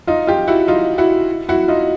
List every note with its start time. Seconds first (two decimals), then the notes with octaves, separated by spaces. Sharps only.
0.07 D#4 F4
0.27 F4 G4
0.48 E4 F#4
0.68 D#4 F4
0.98 E4 F#4
1.49 E4 F#4
1.68 D#4 F4